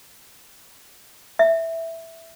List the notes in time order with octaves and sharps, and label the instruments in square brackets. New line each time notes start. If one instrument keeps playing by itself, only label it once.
[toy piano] E5